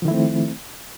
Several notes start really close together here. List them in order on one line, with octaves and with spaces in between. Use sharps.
F3 D#3 E4 A3 C4